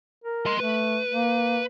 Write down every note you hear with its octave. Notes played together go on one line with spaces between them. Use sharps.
A#4
D#5 C6
A3 B4
A#3